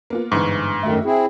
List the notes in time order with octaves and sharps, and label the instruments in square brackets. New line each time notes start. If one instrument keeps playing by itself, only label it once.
[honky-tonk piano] A#3 B3 F4
[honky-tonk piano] G1 E3 C#6 [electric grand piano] G#2
[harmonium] F#2 D#3 A3 [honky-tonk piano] F#4 E5
[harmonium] C4 E4 G#4